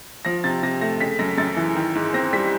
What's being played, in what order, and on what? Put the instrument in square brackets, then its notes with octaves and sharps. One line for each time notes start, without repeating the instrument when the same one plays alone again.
[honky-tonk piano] F3 A#6
C3 A6
C3 A#6
A3 A#6
C#3 B6
F#2 A#6
F#2 A6
E3
D#3
G#2
C4 A#6
G3 B6